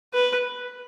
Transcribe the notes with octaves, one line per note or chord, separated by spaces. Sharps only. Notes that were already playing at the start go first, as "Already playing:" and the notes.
B4